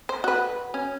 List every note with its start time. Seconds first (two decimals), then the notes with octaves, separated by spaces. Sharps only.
0.09 C5
0.24 F#4 B4
0.74 C#4